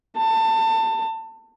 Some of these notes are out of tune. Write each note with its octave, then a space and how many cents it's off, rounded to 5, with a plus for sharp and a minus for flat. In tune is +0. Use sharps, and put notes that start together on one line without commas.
A5 +25